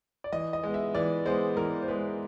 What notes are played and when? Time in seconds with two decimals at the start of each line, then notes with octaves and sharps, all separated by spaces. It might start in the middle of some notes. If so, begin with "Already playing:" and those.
0.24 D5
0.32 E3 D#5
0.53 D#5
0.63 G#3 B3
0.74 E5
0.95 E3 D5
1.25 G#3 B3 C5
1.57 E3 A#4
1.82 C5
1.88 G#3 B3 B4